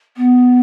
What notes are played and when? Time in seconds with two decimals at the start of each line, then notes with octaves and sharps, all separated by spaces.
0.17 B3